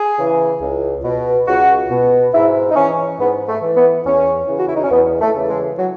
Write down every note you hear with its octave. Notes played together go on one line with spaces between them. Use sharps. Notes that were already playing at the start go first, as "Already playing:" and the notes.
Already playing: G#4
C#3 E3
C#2
B2
C#2 F#4
B2
G#2 E4
D#4
E3 C#4
G#2 B3
A3
E3
B3
E2 C#4
C#3 E3
F#4
E4
D#4
C#4
E2 B3
A3
C#3 E3
G#3
F#3